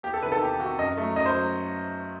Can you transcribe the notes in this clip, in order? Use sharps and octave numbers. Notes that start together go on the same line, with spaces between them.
E2 G4
A4
C3 D#3 B4
A4
E2 G4
C3 D#3 F#4
F#2 D#5
F#3 A3
F#2 D#5
C5
F#3